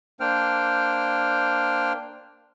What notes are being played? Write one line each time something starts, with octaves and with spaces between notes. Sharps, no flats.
A#3 D4 C5 G5 F6